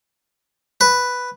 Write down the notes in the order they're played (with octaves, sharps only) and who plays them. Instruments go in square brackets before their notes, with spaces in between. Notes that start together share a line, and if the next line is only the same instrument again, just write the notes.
[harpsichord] B4